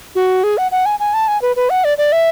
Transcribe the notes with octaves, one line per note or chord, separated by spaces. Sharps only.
F#4
G#4
F#5
F#5
G#5
G#5
A5
G#5
B4
B4
F#5
D5
D5
E5